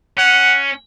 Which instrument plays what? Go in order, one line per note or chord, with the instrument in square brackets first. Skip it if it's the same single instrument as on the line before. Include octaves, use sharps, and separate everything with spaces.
[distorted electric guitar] C#4 [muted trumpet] F#5